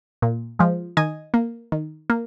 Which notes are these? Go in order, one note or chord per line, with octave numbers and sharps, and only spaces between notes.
A#2
F3 G#3
D#3 D#5 G#5
A#3
D#3
A#3